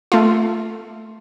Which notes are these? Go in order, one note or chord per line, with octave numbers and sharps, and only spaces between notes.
A3 F4